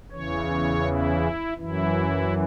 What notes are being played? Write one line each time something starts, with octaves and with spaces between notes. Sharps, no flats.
E2 C#3 E3 C#5
E4
F#2 E3 E4